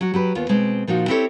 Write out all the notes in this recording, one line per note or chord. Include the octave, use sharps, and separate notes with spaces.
F#3 F#4
F#3 G4 B4
D#2 B3 F4
B2 G#3 C4
A#2 F3 D#4 F#4
C4 E4 G4 A4 B4 C#5